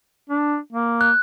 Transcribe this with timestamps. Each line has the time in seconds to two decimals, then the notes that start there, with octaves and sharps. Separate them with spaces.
0.29 D4
0.73 A#3
1.01 F#6